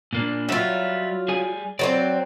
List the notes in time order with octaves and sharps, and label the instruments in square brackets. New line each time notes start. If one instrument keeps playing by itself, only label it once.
[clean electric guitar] A#2 A#3 D4
[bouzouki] F#3 F4 [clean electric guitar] G3 E5
[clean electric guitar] G3 G#4 G#5
[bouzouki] F#3 A#3 C4 [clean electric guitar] D5